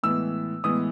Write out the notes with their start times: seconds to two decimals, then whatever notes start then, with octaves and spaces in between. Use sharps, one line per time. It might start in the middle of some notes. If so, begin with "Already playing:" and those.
0.03 A2 E3 G#3 B3 E6
0.64 A2 E3 G#3 B3 D#6